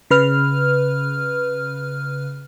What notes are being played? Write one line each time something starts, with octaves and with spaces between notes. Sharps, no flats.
C#3 B4 F6